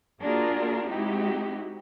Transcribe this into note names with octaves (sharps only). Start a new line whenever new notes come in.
A#3 D4 F4 F#4 G#4 A#4
G#3 C4 D#4 E4 F#4 G4